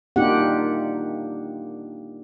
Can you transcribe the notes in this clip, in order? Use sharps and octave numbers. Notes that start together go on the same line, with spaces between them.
A#3 D4 D#4 F4 G4 F#5